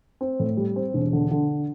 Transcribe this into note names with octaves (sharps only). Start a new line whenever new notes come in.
C4
A2
G3
C4
E1
D3
D3